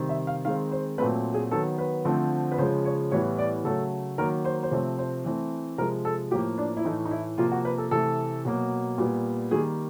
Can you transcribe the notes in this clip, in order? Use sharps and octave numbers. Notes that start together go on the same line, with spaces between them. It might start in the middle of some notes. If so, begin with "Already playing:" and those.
Already playing: C3 D#3 G3 C4
E5
F5
D#3 G#3 C4 F5
C5
A#2 F#3 A3 C4 B4
G#4
D#3 F#3 B3 A4
B4
D3 F3 A3 C4
B4
C#3 F3 G#3 C5
C#5
A2 E3 G3 B3 C#5
D5
C#3 F#3 A3 A4
D#3 F#3 A#3 A#4
C5
C5
C3 F3 A3 C4 C#5
C5
E3 A3 C4
C3 F3 G#3 A#4
A4
A2 F3 A#3 G4
D4
E4
A2 E3 A3 D#4
D#4
E4
C3 F3 A#3 F4
F#4
B4
A4
C3 E3 A3 A4
B2 F#3 A#3
A#2 G3 B3
D#3 G3 A#3 G#4